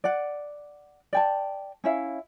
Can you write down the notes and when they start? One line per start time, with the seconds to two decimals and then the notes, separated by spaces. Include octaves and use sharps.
0.04 D5 F#5
1.13 D5 G5 A5
1.84 C#4 E4 E5 F5